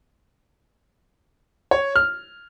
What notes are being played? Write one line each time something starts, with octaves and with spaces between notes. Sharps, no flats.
C#5
F6